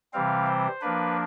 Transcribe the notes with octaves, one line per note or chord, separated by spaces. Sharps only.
C3 E3 G3 C4 F5
C5
F3 A#3 D4 B4